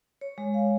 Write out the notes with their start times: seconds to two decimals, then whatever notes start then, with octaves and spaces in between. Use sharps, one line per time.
0.21 C#5
0.38 G#3
0.54 F5